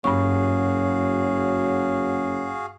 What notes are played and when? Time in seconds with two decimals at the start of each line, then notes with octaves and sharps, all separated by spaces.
0.04 F#1 G2 F#3 F#4 G#4 F5 C#6